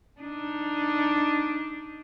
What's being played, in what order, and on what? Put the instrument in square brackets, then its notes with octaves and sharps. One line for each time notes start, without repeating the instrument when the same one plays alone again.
[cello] D4 D#4